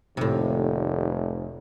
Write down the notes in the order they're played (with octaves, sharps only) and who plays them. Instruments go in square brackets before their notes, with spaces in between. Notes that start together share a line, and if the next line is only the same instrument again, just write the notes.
[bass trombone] F1 [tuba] D#2 [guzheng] A2 C3